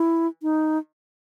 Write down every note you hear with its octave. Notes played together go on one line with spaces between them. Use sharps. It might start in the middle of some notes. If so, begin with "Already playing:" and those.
Already playing: E4
D#4